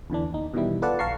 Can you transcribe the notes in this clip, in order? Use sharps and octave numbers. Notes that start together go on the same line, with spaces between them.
E2 D3 E3 D4
D#2 D#4
B2 D#3 E3 G3 E4
F4 A4 B4 D5 F#5 A5
A#1 F5 A5 A#5 C#6 C7